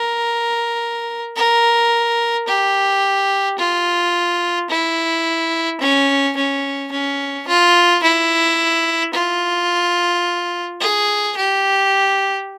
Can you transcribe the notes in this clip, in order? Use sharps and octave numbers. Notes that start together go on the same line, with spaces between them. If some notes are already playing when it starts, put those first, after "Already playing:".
Already playing: A#4
A#4
G4
F4
E4
C#4
C#4
C#4
F4
E4
F4
G#4
G4